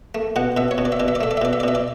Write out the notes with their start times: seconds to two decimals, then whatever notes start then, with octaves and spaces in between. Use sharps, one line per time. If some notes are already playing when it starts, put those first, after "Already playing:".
0.15 A3
0.36 B2 F#5
0.57 B2 E5
0.71 C#5
0.78 B2
0.85 D5
0.92 E5
1.00 B2 D5
1.08 E5
1.15 D5
1.21 A3 E5
1.31 D5
1.37 E5
1.42 B2 D5
1.53 E5
1.60 D5
1.63 B2 E5
1.75 D5